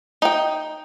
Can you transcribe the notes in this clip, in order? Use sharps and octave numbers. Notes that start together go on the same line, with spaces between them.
D#4 G5